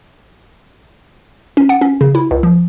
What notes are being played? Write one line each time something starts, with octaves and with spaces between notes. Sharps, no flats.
C#4
F#5
C#4
C#3
E4
C#2
F3